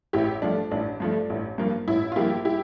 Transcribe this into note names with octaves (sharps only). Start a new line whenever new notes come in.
A1 E4 G4
G2 F3 A3 D4
A1 D4
G2 F3 A3
A1
G2 F3 A#3
A1 E4
F4
G2 F3 A#3 E4 G4
E4 G4